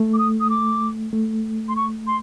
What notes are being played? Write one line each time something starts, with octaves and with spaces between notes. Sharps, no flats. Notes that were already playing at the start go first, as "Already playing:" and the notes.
Already playing: A3
D6
D#6
D#6
D6
A3
C6
C#6
C6